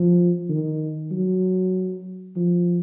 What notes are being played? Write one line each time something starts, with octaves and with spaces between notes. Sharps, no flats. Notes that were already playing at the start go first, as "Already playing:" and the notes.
Already playing: F3
D#3
F#3
F3